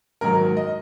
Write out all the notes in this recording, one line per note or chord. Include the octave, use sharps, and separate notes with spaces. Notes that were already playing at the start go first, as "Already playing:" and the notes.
G#2 D#3 F#3 A#3 A#4
D#5